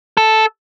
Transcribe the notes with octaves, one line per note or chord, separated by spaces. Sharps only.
A4